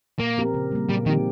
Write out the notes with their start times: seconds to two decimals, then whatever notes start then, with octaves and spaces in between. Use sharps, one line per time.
0.19 A#2 A#3
0.37 F3 C4 G4 A#4
0.54 C#3
0.72 G3 A#3
0.89 A#2 G3
1.06 D#3 F3 C4 D#4 G4